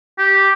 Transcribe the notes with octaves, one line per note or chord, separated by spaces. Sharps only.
G4